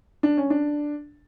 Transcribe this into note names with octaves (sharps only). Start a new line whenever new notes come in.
D4
C#4
D4